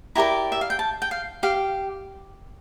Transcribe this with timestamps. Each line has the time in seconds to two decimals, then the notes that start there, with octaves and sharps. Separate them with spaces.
0.15 E4 G4 A#4 D5 A#5
0.52 E5
0.61 F5
0.70 G5
0.79 A5
1.02 G5
1.11 F5
1.43 G4 F5